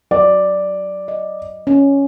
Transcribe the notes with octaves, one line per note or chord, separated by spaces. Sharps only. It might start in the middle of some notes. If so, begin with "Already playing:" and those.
F#3 D5
D#5
C#4